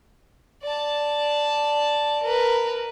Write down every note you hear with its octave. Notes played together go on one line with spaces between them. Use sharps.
D5 A5
A#4 B4